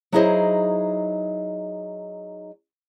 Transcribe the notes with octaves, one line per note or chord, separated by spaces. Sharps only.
F#3 D#4 E4 G#4 C5 D#5